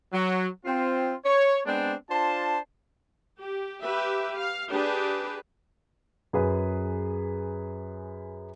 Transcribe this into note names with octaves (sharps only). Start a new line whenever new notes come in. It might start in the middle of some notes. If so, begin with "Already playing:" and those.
F#3
C4 F4
C#5
G#3 B3 C4 D4
D4 F4 C5 A5
G4
G4 B4 E5
F5
D4 G4 G#4 B4
F#2 G#4 B4